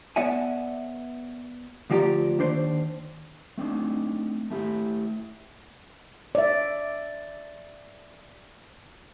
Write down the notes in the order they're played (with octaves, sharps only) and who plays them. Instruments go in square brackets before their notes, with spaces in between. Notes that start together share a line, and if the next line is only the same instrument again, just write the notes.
[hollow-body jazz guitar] B3 C#5 D5 E5 F#5 G#5
D2 F3 F#4 G4 D5 A#5
D#2 D4 C5 D5
[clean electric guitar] A3 C4 D4 D#4
A3 E4 G4
[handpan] D5 E5